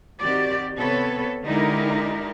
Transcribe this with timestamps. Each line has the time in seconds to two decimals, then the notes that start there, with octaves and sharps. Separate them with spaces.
0.19 D#3 C4 F#4 G4 D5
0.77 C3 B3 A4 B4 C#5
1.45 D3 G#3 D#4 E4 G4 A#4